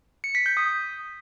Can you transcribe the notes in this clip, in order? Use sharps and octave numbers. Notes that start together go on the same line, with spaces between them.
C#7
B6
G6
D#6